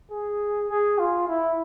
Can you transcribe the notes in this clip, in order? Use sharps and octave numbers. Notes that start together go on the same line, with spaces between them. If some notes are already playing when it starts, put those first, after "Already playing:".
G#4
G#4
F4
E4